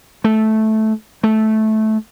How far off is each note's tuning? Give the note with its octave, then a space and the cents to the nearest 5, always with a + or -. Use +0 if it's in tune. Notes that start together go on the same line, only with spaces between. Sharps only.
A3 -10
A3 -15